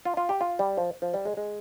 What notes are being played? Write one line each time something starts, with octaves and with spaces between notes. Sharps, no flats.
F4
F4
G4
F4
G3
F3
F3
G3
G#3
G#3